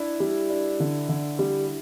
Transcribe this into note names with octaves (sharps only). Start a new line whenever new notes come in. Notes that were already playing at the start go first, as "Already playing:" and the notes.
Already playing: D4 E4
G3
D4
D3
D3
G3